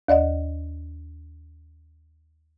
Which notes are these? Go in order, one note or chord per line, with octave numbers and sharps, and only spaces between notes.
D#2 D5 D#5 F#5